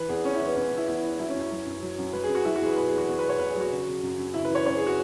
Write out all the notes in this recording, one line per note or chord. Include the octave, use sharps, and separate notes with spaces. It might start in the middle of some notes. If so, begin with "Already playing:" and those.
Already playing: E3 B4
E2 G#4
E3 C#4
E4
E3
B3
E2 C#4
B3
E3 E4
E2 E4
E3
F#3 E4
C#4
F#2
E4
F#3
F#2
F#3
F#2
F#3 B4
G#4
F#2
F#4
F#3 E4
F#4
E2 G#4 B4
B2 B4
G#4
E2 F#4
E2 F#4
B2 B4
C#5
E2 B4
G#4
F#3 F#4
C#3
C#3
F#2
F#2
C#3 E4
B4
E3 C#5
F#2 C#5
G#4
F#4